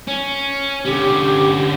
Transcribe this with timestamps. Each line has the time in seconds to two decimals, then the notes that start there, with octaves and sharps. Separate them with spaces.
0.07 C#4
0.85 D3 C#4 G4